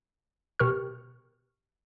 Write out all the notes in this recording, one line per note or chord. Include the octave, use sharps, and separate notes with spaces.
B2 G4 A#4 C#6 F6